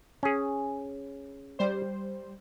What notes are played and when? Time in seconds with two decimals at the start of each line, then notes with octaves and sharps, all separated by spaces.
0.23 C#4 G#4
1.59 G3 C5